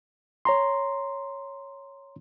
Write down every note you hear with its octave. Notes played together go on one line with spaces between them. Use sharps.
C#5 A#5 C6